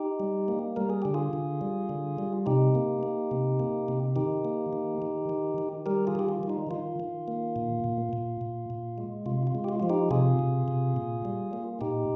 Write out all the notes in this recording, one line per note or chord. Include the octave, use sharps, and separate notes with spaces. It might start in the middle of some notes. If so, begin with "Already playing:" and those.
Already playing: D#4 G4
G3
A#3
G3 A#4
G#4
D3 G4
F4 G#4
D3
G3
D3
G3
C3 D#4 G4
A#3
A#3
C3
A#3
C3
D#3 D#4 G4
A#3
D#3
D#3
D#3
D#3
G3 G4 A#4
F4 G#4
D#3 G4
F4
D#3
D#4
D#3 F4
D#3
A#3
A#2
A#2
A#2
A#2
A#2
G#3
C3 F4
F4
G#3
G4
F4
F3 F4
D#4 G4
C3 F4 G#4
C3
C3
A#2
G3
A#3
A#2 D#4 G4